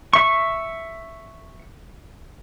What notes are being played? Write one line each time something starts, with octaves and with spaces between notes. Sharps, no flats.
E5 C#6